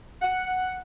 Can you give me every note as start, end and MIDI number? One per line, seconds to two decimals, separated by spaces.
0.22 0.79 78